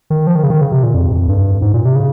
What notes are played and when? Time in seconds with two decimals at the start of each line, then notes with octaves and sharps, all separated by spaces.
0.10 D#3
0.27 F3
0.35 D#3
0.43 C#3
0.50 D#3
0.61 C#3
0.72 C3
0.83 A#2
0.95 F2
1.11 F2
1.28 G2
1.62 G#2
1.74 A#2
1.85 C3
1.95 C#3